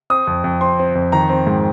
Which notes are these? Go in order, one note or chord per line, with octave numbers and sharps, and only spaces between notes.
C4 D#6
F2
F2
C4 C6
C4
F2
D#3 A#5
C4
G#2